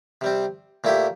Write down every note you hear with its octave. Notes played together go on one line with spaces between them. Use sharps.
C3 G3 C4
A#2 A3 E4 G4